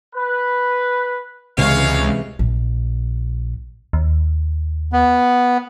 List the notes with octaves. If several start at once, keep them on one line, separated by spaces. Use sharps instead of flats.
B4
C#2 C3 E3 G#3 C#5 F5
A#1
D#2
B3